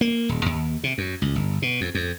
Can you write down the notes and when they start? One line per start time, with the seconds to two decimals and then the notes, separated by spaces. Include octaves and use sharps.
0.01 A#3
0.29 D#1
0.46 D#2
0.84 C3
0.98 F#2
1.22 C#2
1.35 G1
1.62 B2
1.81 F2
1.95 F2